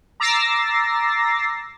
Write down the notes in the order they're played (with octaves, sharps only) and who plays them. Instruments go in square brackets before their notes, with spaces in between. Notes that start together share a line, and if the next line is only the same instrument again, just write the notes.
[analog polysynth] A#5 D6 E6 A6 A#6 C7